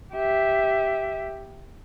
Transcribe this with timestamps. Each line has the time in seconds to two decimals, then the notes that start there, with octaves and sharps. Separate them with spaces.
0.14 G4 E5